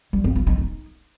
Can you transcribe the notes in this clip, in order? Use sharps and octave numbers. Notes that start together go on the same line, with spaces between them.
G3
C4
F4
D#4
D#4